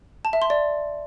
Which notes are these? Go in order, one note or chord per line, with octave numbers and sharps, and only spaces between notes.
A5
E5
C6
D5